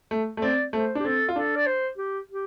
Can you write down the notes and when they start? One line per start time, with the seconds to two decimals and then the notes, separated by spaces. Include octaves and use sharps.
0.11 A3
0.37 A3
0.42 C4 D5
0.73 A3 C5
0.95 D4
1.00 G4
1.05 C4 A4
1.29 F4
1.35 D4 A4
1.56 D5
1.66 C5
1.98 G4
2.30 G4